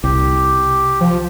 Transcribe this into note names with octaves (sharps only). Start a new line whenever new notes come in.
C2 G4
F3